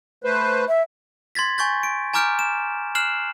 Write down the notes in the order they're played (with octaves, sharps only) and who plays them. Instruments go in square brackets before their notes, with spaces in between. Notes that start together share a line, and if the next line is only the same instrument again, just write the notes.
[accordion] A3 B4 C5
[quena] E5
[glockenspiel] C6 G#6 A6 B6
G#5 C#6 G6 A6
D7
G#5 A#5 D6 F6 G6 D7
E7
F6 F#6 C7 E7 F#7